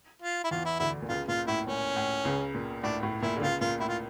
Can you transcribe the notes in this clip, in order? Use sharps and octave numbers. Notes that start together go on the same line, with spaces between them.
F4
E4
E2 E3 F4
E4
D2 D3 E4
A#2
C#2 C#3 F4
A#2 F4
A2 E4
A#2 C#4
A2
C#2 C#3
A#2
A2 D4
A2
A#2 E4
D3
C#2 C#3 F4
A#2 F4
A2 E4
F4